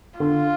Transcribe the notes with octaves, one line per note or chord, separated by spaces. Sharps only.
D3 F4